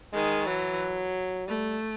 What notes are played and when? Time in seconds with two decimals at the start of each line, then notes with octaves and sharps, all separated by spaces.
0.13 D#3 G#3
0.46 E3 F#3
1.47 G3 A3